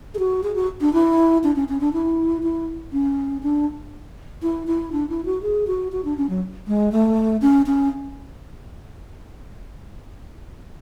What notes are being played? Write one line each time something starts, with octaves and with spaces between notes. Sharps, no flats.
G#4
F#4
G#4
F#4
D4
E4
D4
C#4
C#4
D4
E4
E4
C#4
D4
E4
E4
D4
E4
F#4
G#4
F#4
F#4
D4
C#4
F#3
G#3
A3
C#4
C#4